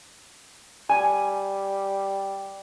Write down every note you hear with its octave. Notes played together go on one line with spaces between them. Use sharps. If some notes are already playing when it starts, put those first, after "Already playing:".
G3 G#5